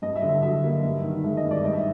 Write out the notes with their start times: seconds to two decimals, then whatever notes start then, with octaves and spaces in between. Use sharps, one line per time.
0.02 G2 D#5
0.16 E5
0.22 D3
0.29 E5
0.42 F#3 E5
0.63 A#3
0.84 G2
1.03 D#3
1.24 G#3 E5
1.37 D#5
1.44 G2
1.51 D5
1.64 G#2 D#5
1.73 E5